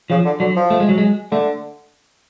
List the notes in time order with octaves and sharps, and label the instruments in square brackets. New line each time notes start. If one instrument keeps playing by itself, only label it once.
[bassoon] C#3 [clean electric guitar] F3
[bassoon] D3
[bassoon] D3 [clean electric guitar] F#3
[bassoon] F3
[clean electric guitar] A3
G#3
F#3
G#3
[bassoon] D3 [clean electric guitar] A3